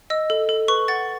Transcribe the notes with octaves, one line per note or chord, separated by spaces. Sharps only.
D#5 E6
A4
A4
B4 C#6
F#5 A6